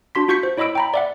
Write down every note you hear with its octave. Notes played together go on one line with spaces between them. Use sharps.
D4 F#4 C6 B6
F4 F#4 C#6 G6 B6 C#7
C5
E4 C#5 D#5 B5 E6 D7
G5 A#5 B5
D5 E5 F#5